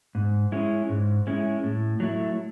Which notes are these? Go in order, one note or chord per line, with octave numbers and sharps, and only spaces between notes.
G#2
G#3 C#4 E4
G#2
G#3 C#4 E4
A2
F#3 A3 E4